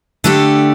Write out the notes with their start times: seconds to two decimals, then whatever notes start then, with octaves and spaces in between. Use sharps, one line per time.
0.24 D3 A3 D4 G4